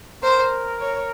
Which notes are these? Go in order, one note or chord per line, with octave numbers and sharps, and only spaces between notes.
A#4 C5
C#5